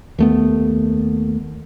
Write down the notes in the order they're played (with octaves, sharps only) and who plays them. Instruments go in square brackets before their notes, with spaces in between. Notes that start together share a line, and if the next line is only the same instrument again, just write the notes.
[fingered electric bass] D#2 A3 B3